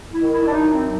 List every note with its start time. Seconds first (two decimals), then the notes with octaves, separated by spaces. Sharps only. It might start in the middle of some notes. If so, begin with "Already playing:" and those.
0.11 E4
0.22 D#3
0.32 E4
0.46 D4
0.51 F#2 D#4
0.71 C4
0.82 F#3